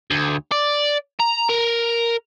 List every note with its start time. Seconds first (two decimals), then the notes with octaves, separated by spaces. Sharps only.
0.11 D2
0.52 D5
1.20 A#5
1.49 A#4